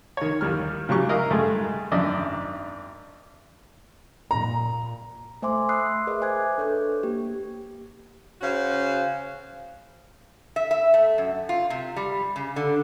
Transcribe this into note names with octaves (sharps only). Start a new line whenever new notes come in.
D#3 C#5
D#2 D#3 G3 F6
C#3 F#3 G3 C#6
E4 A#4 D#5 F5
G2 G#3 A3
G#1 F#2 D4 D#5 E5
A#2 A#5
A3 C5 E5 G#5 C6 D6
B5 C6 D#6 E6 F#6 C7
G#4 A#4 B4 D#5 E5
C5 G#5 D6 F#6 G#6
D4 A4 B4 C#5 C#6 G6
A#3 G4
C#3 C#4 F#4 C5 F5
E5
E5
A3
F#2
F4
C3
G3
C#3
D3